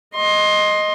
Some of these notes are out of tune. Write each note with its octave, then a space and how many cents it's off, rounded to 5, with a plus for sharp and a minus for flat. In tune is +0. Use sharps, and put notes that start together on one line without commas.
D#5 +0 C6 +20